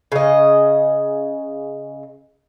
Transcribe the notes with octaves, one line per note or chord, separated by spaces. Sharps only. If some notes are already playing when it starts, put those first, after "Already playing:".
C#3 D#5